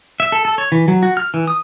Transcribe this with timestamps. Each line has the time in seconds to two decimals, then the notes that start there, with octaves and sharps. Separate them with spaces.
0.20 E5
0.32 A4
0.45 A4
0.58 C#5
0.72 E3
0.88 F#3
1.03 F#4
1.17 F6
1.34 E3
1.47 D#6